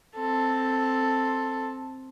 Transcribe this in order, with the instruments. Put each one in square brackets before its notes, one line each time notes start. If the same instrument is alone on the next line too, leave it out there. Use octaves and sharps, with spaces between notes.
[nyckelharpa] C4 A4